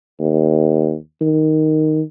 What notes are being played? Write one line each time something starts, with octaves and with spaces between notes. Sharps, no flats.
D#2
D#3